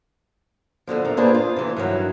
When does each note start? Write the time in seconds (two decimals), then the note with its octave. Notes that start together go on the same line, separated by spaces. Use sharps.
0.87 F2 B2 D3 F3
1.05 C3 A#4
1.17 A#3 D4 F4 G#4 B4 C5
1.34 F4
1.56 C3 E3
1.77 G2 D#3 F#3 E4